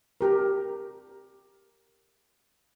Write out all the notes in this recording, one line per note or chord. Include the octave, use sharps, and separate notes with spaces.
G4 A#4